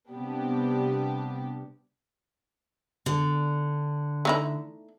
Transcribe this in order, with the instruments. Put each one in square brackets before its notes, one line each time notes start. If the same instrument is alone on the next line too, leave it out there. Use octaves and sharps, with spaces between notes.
[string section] C3 G3 B3 D4 G4
[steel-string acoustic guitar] D3
[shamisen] A3 D#4 E4